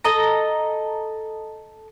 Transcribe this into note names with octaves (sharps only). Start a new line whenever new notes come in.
A4 D#5 A#5